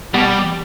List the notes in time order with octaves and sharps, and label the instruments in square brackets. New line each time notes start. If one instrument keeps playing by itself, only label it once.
[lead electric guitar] B2 [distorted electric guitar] G3